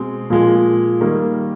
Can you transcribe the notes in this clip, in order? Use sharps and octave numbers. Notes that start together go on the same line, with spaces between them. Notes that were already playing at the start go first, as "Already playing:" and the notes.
Already playing: B2 G#3 C4
A#2 F3 G#3
D#3 G3 A#3